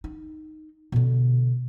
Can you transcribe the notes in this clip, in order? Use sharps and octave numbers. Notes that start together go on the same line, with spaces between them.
D#4
B2 D3